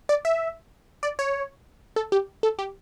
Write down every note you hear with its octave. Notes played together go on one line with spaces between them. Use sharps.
D5
E5
D5
C#5
A4
G4
A4
G4